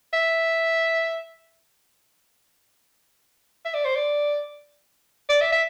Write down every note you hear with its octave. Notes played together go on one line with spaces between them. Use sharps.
E5
E5
D5
C5
D5
D5
E5
E5